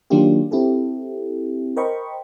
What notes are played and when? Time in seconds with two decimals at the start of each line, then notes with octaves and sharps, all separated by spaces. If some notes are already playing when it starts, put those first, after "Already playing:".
0.10 D#3 F#3 A#3 D4 F4 G4
0.51 C4 E4 G4 A4
1.76 A#4 C5 D#5 G5 B5 C#6